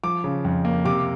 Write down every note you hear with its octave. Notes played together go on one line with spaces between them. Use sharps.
F3 D6
C#3
F2
A#3
C3 D6